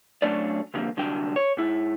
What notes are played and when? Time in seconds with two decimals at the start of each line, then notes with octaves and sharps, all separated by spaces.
0.22 F#3 A3 C#4 D4 D5
0.74 C2 F2 D3 D#3 F3 A#3
0.97 C2 D3 F#3 G5
1.36 C#5
1.57 G#2 E4